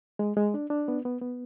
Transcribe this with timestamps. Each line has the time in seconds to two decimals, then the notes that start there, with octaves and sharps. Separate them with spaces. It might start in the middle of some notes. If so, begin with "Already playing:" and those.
0.19 G#3
0.37 G#3
0.54 D4
0.70 D4
0.88 B3
1.05 B3
1.21 B3